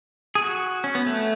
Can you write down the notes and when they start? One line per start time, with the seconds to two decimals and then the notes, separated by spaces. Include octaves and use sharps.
0.35 G#4
0.42 F#4
0.84 C#4
0.95 B3
1.06 A3